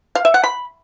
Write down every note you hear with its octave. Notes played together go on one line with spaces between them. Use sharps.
F5
E5
F#5
B5